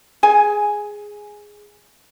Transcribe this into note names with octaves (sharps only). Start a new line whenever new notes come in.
G#4 G#5